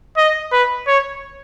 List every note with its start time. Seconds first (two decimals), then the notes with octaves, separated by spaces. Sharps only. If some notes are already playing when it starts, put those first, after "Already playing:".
0.17 D#5
0.52 B4
0.88 C#5